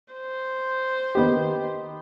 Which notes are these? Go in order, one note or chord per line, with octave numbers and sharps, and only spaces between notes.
C5
D#3 B3 G4